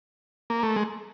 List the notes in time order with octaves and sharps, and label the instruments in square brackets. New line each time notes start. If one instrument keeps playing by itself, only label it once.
[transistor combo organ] A#3
A3
G#3